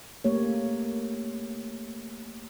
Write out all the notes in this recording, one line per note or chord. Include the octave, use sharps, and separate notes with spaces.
A3 A#3 G4 C#5